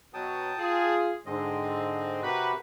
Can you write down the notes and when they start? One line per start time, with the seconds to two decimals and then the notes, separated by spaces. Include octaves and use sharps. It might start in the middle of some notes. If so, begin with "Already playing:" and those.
0.14 B2 F#3 G5 A5 D#6
0.58 F4 G#4
1.26 G#2 D3 G#3 C4 D#5
2.23 C3 F#4 G4 A#4 B4